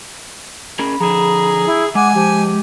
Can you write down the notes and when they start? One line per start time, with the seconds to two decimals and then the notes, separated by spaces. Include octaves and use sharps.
0.79 C#4 G#4 A#4 B5
1.00 D3 F3 G#4 A#5
1.66 E4
1.95 G#3 F#5 G#5 D6
2.15 F3 G4